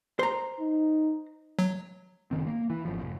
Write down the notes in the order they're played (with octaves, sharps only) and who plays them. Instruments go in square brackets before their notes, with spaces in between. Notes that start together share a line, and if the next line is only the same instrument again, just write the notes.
[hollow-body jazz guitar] C5 A#5
[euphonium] D#4
[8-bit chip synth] F#3
[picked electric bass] F#1 D#3 C4
A#3
E3
G#1 F3
F1